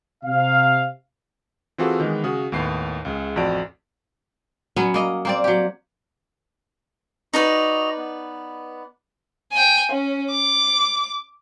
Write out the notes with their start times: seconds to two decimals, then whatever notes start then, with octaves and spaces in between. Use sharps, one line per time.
0.24 C3 F5
1.78 E3 C4 F4 F#4 G#4 A4
2.00 D#3 E3 G#3 B3
2.24 C#3 F#4 D#6
2.52 D#2 A2 B3 C7
3.05 C#2 C#3
3.36 A1 F2 F#4 D5 D7
4.76 F#3 B3 C#4
4.94 A#3 D#5
5.25 A#3 C4 D5
5.44 F#3 G4
7.34 D#4 F#4 B4 D5 D#5 A#5
7.97 B3
9.52 G5 G#5
9.92 C#4
10.31 D6